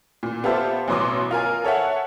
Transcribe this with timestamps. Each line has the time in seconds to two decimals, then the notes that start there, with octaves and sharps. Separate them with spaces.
0.23 A#2
0.44 B3 F4 G4 A4 C5 E5
0.88 A1 B2 F#3 C6 D6 D#6
1.31 F4 A#4 G#5
1.64 A4 C#5 E5 F#5